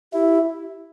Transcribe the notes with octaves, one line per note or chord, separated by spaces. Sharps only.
E4 G4